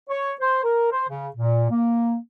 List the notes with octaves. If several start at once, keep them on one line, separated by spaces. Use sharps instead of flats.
C#5
C5
A#4
C5
C#3
A#2
A#3